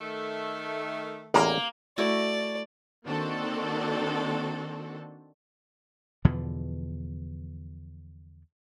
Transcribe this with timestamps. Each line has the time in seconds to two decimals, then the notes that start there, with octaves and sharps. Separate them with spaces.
0.01 D#3 A3
1.34 A1 E2 A#3 A#4
1.98 A3 E4 F#4 D5
3.05 D#3 A#3 C4 D4 F#4 A4
6.25 E2 B2 D3 F3